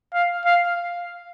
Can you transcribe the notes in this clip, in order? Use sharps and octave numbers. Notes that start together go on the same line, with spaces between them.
F5
F5